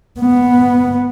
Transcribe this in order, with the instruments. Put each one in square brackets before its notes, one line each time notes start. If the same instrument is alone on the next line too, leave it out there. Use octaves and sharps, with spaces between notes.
[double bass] B3